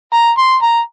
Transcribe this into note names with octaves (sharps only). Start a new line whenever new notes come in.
A#5
C6
A#5